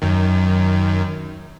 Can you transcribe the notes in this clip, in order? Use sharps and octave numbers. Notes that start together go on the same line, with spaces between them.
F#2 D#3